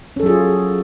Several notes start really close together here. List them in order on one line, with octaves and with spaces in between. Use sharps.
C#4 A4 F#3 G#4 F4